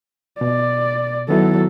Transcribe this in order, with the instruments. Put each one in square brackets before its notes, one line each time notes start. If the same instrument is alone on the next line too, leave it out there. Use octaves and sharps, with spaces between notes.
[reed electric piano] B2 [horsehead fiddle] D5
[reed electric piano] D#3 B3 E4 [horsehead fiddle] F#3 A4